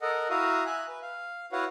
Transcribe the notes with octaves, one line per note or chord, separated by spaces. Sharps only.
A4 A#4 D#5 F#5
E4 F#4 E5 F5 A#5 D#6
E5 G#5 F#6
B4
F5
E4 F#4 B4 C#5 F5 F#5